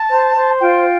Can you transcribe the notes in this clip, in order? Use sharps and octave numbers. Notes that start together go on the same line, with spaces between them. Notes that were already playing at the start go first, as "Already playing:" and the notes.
Already playing: A5
C5
C5
F4 G5